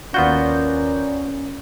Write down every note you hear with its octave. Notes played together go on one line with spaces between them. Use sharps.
D#2 B3 C#4 F4 F#4 A#4 D5 G6